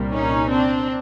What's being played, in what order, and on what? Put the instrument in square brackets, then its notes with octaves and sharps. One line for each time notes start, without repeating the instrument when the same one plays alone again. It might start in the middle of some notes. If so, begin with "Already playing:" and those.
Already playing: [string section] C2 A#2 G3 A#3
C#4 D#4
C4 D4